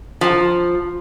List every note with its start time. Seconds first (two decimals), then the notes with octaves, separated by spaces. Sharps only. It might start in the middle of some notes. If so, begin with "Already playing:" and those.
0.21 F3